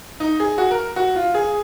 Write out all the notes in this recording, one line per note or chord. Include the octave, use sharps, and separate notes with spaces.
D#4
G#4
F#4
A#4
F#4
F4
G#4